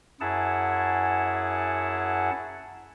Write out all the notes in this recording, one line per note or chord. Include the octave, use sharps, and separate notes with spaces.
F#2 E4 G#4 F#5 A5